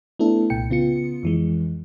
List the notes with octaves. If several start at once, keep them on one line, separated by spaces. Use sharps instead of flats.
A3 B3 D4 E4 A4
C2 A#2 G5 C#7
C#3 B3 F4 C#7
F2 E3 G#3